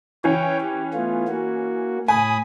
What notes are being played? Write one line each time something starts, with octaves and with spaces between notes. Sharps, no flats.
E3 C#4 C#5 G5
G4
A3 B3 F4
A#3 F#4
A2 G#5 B5 D#6